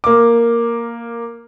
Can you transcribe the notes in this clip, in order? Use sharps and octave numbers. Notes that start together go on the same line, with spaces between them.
A#3 D6